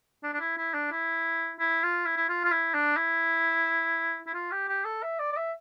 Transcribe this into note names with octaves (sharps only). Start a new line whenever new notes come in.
D4
D4
E4
E4
D4
E4
E4
F4
E4
E4
F4
F4
E4
D4
E4
E4
F4
G4
G4
A4
E5
D5
D5
E5